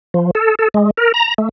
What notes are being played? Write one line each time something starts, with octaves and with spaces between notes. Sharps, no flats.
F3
A4
A4
G#3
A#4
A#5
A3